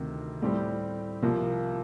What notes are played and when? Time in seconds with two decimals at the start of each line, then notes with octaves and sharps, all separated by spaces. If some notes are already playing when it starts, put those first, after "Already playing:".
Already playing: D2 C3 D#3
0.42 A2 G3 C4 G4
1.22 C2 C3 F3 A#3